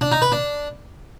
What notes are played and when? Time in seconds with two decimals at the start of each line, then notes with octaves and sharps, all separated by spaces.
0.01 D4
0.11 D#4
0.22 B4
0.32 D4